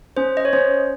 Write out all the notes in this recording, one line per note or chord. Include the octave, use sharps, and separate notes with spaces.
C#4 C5
D#5
C#5
C#4 C5